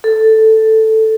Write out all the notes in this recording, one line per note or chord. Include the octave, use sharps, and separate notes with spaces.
A4